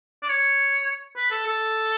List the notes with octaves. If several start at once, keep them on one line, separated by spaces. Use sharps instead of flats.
D5
C#5
B4
A4
A4